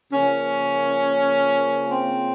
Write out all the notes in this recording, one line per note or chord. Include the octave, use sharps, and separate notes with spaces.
C#3 F3 A#3 C#4
C4